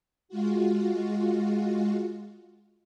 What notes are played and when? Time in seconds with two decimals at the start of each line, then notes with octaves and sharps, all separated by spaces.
0.29 G#3 F4 F#4